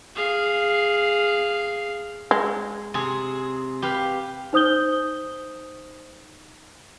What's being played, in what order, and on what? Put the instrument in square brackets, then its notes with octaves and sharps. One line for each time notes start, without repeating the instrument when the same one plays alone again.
[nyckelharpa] G#4 F5
[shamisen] G#3
[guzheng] C3 G#4
G4 B4 F5
[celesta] D#4 C5 D#6 G6 G7